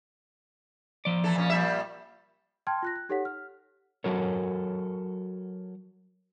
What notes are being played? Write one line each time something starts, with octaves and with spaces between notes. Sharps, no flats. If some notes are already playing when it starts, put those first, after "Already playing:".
F3 D5
E3 A4
A#2 C#4
A#2 G3 E5
G5 A5 C6 F6 G#6
F4 F#6 A#6
F#6
D#4 G4 A4 C#5 F#5 B6
F6
F#3 F#4 A4 A#4 C#5